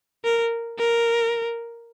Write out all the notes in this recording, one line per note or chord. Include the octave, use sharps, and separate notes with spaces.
A#4
A#4